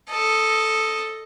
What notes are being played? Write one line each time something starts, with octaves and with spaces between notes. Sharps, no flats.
A4 D#5